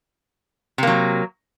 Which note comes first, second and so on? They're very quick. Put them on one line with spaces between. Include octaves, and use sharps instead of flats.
C3 A#3 F#3